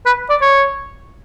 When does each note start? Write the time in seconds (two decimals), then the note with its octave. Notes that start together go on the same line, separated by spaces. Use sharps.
0.06 B4
0.30 D5
0.42 C#5